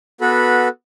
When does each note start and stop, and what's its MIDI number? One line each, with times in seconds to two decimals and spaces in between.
0.21 0.68 59
0.21 0.68 66
0.21 0.68 69
0.21 0.68 71
0.21 0.68 83